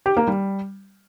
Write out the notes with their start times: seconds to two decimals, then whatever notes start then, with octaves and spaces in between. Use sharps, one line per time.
0.06 G4
0.17 A#3
0.27 G3